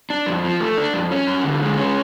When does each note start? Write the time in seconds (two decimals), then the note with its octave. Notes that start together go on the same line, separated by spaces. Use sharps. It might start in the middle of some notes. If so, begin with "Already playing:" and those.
0.10 D4
0.26 F2
0.44 F3
0.60 A3
0.78 D4
0.94 F2
1.11 C#4
1.27 F#2
1.44 D3
1.61 G#3
1.77 C#4